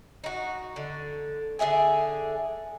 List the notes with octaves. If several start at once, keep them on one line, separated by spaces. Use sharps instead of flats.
D#4 F#4
D3
D3 G#4 E5 G#5